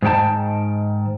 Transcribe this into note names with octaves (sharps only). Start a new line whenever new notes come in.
G#2 D#3 D4 G5 A5